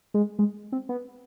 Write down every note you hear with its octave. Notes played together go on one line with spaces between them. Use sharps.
G#3
G#3
C4
B3